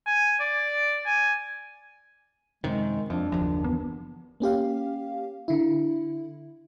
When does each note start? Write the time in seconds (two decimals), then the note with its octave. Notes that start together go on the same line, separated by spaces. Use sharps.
0.06 G#5
0.40 D5
1.06 G#5
2.64 F#2 C3 D#3 G#3
3.10 F2 F3 D4
3.32 F#1 D#2 F3
3.64 E3 B3
4.40 A#3 C#4 G4 F5
5.48 D3 E4